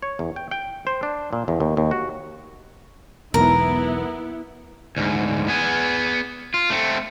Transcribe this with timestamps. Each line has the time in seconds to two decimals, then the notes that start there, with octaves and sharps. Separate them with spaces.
0.02 C#5
0.19 E2
0.36 G5
0.51 G5
0.87 C5
1.03 D4
1.33 A#2
1.48 E2
1.60 D#2
1.77 D#2
1.91 F#4
3.34 E1 B1 B3 E4 A#4
4.96 D2 G#2
5.48 B3 G#4
6.54 F4
6.70 A3 C4